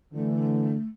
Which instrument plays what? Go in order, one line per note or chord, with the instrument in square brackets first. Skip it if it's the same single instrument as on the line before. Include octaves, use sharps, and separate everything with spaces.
[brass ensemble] D3 E3 [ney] A3